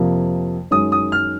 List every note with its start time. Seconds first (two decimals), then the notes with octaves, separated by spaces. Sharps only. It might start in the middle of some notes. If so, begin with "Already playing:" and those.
Already playing: F2 C3 F3 A#3
0.71 F#2 D#3 G#3 C#4 D#6
0.92 D#6
1.12 F6